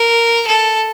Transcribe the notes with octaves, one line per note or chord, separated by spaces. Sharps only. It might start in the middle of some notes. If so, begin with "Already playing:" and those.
Already playing: A#4
A4